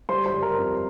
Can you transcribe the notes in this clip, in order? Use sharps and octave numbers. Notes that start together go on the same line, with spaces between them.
G3 C5 C6
C5 C6
G3
A#4 A#5
F2